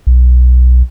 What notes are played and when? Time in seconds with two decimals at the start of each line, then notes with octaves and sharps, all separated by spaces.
0.07 B1